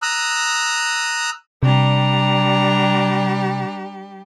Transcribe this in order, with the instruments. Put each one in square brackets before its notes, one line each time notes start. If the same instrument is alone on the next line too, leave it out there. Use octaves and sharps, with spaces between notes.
[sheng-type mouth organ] A#5 D#6 E6 F#6
[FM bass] C3 [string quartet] G3 G4 [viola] D4 A#5